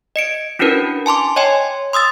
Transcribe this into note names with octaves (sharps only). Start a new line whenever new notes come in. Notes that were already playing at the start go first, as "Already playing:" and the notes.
D#5 C#7 D7
C#4 D4 E4 F#4 A#4 B4
G#5 A5 C6 D6
C#5 D#5 G5 G#5 C6
C6 D#6 E6 A6